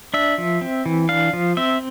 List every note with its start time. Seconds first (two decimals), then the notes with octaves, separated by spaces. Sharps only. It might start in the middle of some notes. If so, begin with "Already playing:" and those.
0.14 D4 E5
0.38 F3
0.61 C4
0.86 E3
1.09 D4 F5
1.33 F3
1.57 C4 E5